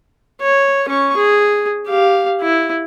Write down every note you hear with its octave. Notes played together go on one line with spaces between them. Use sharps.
C#5
C#4 C#6
G#4
G4 F5
E4